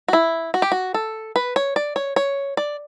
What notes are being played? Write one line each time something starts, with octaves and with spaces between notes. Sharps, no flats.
F#4
E4
F#4
G4
F#4
A4
B4
C#5
D5
C#5
C#5
D5